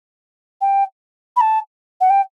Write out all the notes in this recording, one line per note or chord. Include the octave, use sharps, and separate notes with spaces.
G5
B5
A5
F#5
G5